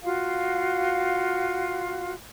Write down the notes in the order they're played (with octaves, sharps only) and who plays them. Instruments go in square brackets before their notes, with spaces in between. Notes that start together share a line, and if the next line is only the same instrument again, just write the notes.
[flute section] F4 F#4 F5